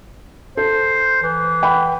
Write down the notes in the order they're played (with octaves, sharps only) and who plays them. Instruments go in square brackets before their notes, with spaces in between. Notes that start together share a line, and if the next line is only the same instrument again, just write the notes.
[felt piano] A4 [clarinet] C5
[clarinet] E3
[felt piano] F#5 G5 B5